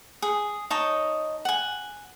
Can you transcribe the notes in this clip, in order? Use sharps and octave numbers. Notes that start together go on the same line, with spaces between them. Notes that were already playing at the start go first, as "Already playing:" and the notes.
G#4
D#4 C#5 D#5 A5
F#5 G#5